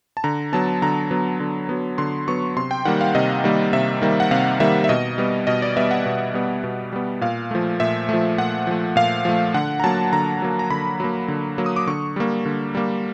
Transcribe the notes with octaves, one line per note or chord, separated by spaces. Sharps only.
A5
D3 A#5
F#3 B3 A5
D3 A#5
F#3 B3
D3
F#3 B3
D3 C6
F#3 B3 C#6
C3 C6
G5
D#3 G3 A#3 F#5
F5
C3 D#5
D#3 G3 A#3
C3 E5
D#3 G3 A#3
F#5
C3 F5
D#3 G3 A#3 E5
E5
B2 D#5
G3 B3
B2 D#5
D5
G3 B3 E5
F#5
B2
G3 B3
B2
G3 B3
A#2 F5
F3 A3
A#2 E5
F3 A3
A#2 F#5
F3 A3
A#2 F5
F3 A3
D3 F#5
A#5
F#3 A#3 A5
D3 A#5
F#3 A#3
A#5
D3 B5
F#3 A#3
D3
F#3 A#3
D#6
D6
D3 C#6
G3 A#3
D3
G3 A#3